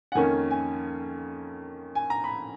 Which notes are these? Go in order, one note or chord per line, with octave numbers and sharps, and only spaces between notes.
F#5
F2 D#3 A#3 C#4 G#5
G#5
G#5
A#5
B5